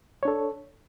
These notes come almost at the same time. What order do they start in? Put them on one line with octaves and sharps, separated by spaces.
C#5 D4 A4